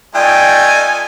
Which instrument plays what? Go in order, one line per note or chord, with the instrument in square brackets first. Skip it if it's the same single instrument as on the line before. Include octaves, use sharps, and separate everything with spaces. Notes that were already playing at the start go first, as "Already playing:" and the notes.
[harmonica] A3 D#4 F4 [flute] D5 [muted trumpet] G5 [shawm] G#5